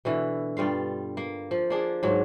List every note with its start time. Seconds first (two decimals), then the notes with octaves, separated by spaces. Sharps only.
0.05 B2 D3 E3
0.57 G2 G3 F4 F5
1.17 A#3
1.51 F3
1.70 A#3 D4 G#4
2.03 G#2 F#3